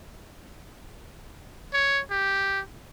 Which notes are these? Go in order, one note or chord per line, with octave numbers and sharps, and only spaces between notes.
C#5
G4